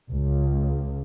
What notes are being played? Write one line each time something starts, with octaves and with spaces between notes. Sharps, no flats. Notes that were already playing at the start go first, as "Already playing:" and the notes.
C#2